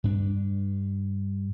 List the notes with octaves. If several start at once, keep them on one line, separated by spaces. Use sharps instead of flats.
G2 D4